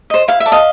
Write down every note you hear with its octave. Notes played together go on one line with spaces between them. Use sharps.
C5 D#5
E4 F5
E5
A4 D5
D#5 F5